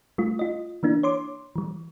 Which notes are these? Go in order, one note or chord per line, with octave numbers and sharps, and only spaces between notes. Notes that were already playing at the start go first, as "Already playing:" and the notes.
G3 A3 F4
F4 D#5
E3 A#3 D4 E4
C#5 C6 D6
E3 G3